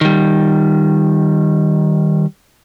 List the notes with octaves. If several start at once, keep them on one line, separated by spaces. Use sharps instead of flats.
D#3 G3